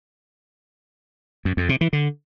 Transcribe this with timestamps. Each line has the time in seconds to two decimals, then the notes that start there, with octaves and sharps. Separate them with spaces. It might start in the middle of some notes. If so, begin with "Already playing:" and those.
1.45 F#2
1.57 F2
1.69 C3
1.81 E3
1.93 D3